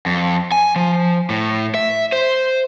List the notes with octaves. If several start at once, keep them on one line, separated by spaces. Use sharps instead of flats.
F2
G#5
F3
A2
E5
C5